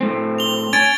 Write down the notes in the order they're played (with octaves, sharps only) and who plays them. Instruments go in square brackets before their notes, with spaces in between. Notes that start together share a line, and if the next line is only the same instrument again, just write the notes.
[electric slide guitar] A2 C4
[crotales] F7 G7
[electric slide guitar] C#4 [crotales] G#6 A6 D7